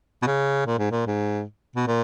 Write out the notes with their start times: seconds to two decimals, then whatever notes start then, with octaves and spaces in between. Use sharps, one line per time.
0.22 B2
0.27 C#3
0.67 A#2
0.79 G#2
0.91 A#2
1.07 G#2
1.76 B2
1.87 A#2